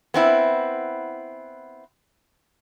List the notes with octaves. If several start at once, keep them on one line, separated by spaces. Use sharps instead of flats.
B3 C4 E4